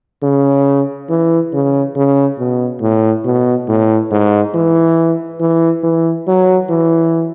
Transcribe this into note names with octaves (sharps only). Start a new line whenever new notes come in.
C#3
E3
C#3
C#3
B2
A2
B2
A2
G#2
E3
E3
E3
F#3
E3